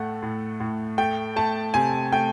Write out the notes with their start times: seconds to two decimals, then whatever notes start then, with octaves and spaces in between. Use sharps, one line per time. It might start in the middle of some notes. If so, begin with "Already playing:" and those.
Already playing: A2 A3 F#5
0.22 A2
0.60 A2
0.98 A3 G5
1.36 A3 A5
1.74 C3 G#5
2.13 A3 G5